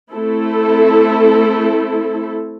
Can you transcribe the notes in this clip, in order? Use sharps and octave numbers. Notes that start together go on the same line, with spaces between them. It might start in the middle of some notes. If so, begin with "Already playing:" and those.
A3 C4 E4 A4